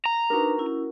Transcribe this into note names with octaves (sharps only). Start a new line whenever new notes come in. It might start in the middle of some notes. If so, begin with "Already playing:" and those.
A#5
D4 D#4 F#4 A#4 B4
C#4 E4